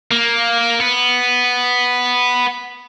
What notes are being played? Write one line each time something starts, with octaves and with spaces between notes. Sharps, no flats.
A#3
B3